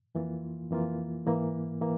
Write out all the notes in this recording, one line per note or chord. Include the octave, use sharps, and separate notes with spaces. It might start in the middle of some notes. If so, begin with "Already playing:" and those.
F2 E3 A#3 F4
F2 E3 A#3 F4
G#2 E3 A#3
E3 A#3